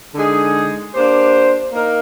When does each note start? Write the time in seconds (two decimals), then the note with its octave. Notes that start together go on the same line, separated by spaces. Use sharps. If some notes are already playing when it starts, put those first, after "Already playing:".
0.15 D3 G#3 D#4 G#4
0.94 A#3 D4 G4 C5
1.73 A#3 D#4 A#4